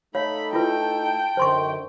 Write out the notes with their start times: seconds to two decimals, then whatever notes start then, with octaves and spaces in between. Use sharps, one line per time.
0.15 A3 D#4 A4 C#5 F5 B5
0.53 E4 F4 B4 G5 A5
1.37 F#2 D3 D#3 C5 C6 C#6